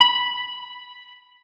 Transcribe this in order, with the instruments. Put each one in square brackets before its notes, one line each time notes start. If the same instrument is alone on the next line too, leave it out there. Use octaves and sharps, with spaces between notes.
[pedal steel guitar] B5